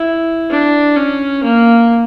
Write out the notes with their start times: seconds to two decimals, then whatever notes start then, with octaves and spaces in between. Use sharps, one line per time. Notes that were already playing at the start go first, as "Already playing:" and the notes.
Already playing: E4
0.50 D4
0.97 C#4
1.43 A#3